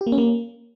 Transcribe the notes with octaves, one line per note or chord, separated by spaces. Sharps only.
G4
A#3
C#4
A#3